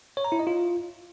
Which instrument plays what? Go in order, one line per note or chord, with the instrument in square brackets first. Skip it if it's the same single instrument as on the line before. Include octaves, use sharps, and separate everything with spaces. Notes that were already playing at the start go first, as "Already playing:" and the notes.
[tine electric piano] C#5
A#5
E4
D#5
F4